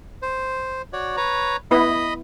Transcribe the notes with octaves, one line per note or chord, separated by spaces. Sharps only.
C5
F#4 C#5 D5
B4 C#5 A#5
B3 E4 B4 D#5 B5 D#6